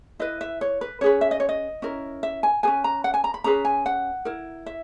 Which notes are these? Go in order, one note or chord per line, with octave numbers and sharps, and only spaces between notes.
E4 B4 D#5
E5
C#5
B4
C#4 G#4 B4 C#5
E5
D#5
C#5
D#5
C#4 E4 A#4
E5
G#5
C#4 G#4 B4 G#5
A#5
F#5
G#5
A#5
B5
C#4 G#4 B4 A#5
G#5
F#5
E4 A#4
E5